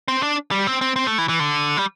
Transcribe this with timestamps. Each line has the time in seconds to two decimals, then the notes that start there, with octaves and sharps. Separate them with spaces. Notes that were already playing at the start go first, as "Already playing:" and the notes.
0.08 C4
0.23 D4
0.51 G3
0.67 C4
0.81 C4
0.96 C4
1.07 A3
1.18 E3
1.29 E3
1.40 D3
1.77 G3